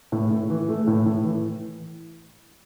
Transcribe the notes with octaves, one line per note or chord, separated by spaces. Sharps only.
A2
A2
E3
A3
A2
A2
E3